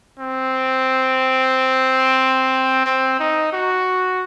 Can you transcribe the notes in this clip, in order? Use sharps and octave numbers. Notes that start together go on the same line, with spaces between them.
C4
C4
D#4
F#4